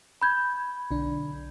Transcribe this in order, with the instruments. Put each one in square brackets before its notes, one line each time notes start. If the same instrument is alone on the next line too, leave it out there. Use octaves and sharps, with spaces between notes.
[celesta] B5 G6 G#6
[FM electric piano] B1 D3 D4